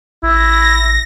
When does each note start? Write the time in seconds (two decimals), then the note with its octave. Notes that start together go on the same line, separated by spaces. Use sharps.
0.23 A1 E4 A#6